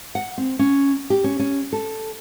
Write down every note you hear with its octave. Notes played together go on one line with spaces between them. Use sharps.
F#5
C4
C#4
G4
C#4
C#4
A4